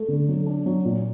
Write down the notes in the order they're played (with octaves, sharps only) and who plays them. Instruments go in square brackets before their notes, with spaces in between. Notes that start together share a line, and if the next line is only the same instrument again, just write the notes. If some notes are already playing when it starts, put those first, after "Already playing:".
Already playing: [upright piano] A3
D3
F#3
D4
F#3
A#2